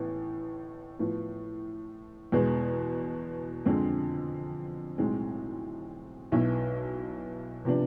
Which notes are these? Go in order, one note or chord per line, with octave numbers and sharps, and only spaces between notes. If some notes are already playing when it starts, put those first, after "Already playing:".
Already playing: A1 A2 E3 B3
A2 F3 B3
E2 B2 G#3 B3
F2 D3 G#3 C4
B1 A2 G#3 C4
B1 B2 B3 E4
C3 F3 B3 D4